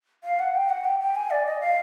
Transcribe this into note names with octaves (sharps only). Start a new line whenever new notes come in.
F5
F#5
G5
F#5
G5
G5
G#5
D5
D#5
F5